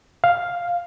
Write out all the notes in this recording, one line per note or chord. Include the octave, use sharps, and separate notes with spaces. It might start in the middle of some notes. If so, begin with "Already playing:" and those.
F5